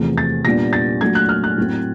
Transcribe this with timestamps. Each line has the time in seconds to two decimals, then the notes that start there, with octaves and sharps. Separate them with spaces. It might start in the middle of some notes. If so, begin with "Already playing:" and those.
Already playing: E2 C3 F3 A3
0.18 A6
0.45 A#2 G3 B3 D4 A#6
0.73 A6
1.01 A#2 F#3 A3 D4 G#6
1.15 F#6
1.29 F6
1.44 F#6
1.58 A2 F#3 A3 C4